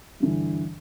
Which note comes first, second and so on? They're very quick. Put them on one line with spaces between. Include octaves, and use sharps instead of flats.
G2 D3 E3